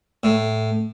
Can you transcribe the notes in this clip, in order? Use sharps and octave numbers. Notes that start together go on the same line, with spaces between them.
A2